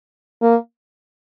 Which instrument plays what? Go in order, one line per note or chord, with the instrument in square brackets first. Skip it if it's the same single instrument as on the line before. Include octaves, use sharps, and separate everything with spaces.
[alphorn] A#3